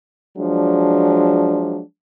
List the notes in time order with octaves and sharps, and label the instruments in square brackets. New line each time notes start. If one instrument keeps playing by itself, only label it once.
[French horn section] F3 F#3 G#3 D4